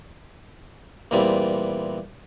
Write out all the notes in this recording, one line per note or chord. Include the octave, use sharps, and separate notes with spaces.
E2 A#2 E3 G3 A#3 C4